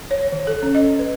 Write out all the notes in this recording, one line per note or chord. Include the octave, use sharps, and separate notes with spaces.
C#5
D#3
A4
C#4
D#5
B4